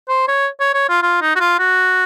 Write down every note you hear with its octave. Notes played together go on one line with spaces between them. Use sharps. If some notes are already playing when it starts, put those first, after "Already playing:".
C5
C#5
C#5
C#5
F4
F4
D#4
F#4
F4
F#4